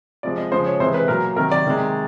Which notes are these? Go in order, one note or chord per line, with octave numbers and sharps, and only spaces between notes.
C3 F3 G#3 D5
D#5
C#3 F3 G#3 C5
C#5
C3 E3 G#3 C5
B4
A#2 F#3 A#4
C3 D#3 F#3 A#4
D5
C3 D#3 G#3